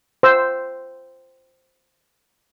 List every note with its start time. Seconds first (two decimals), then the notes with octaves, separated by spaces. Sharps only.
0.23 C5 E6